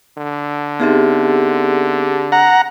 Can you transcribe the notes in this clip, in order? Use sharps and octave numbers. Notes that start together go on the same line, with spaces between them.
D3
B3 C4 D#4 G4 G#4 E5
F#5 A#5